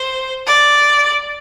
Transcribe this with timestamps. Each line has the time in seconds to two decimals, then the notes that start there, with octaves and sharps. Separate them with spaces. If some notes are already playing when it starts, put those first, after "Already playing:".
Already playing: C5
0.47 D5